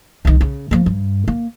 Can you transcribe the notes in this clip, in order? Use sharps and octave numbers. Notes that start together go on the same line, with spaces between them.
C2 D#3
C#3
F3 A#3
G2
A#3